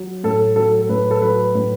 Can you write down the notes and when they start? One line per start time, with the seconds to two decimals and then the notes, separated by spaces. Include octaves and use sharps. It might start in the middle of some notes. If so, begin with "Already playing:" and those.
Already playing: F#3
0.24 A2 A4
0.56 F#3 A4
0.82 A4
0.89 A2 B4
1.11 A4
1.21 F#3 B4
1.55 A2